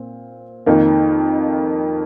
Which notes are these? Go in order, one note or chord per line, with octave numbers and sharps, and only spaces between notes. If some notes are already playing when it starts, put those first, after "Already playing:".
Already playing: A#2 C4
F2 D#3 A#3 D#4